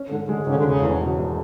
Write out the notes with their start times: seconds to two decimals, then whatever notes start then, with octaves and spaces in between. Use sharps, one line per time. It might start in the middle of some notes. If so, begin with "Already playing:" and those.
Already playing: C#4
0.10 G#2 D3
0.29 D3 G#3
0.46 G#1 C#3
0.55 D3
0.64 E1 C#3
0.83 E2
1.00 B2
1.18 E1